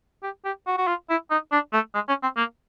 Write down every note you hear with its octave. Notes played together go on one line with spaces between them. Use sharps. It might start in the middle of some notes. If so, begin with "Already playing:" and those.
G4
G4
F#4
F#4
F4
E4
D#4
D4
A3
G#3
C#4
C4
A#3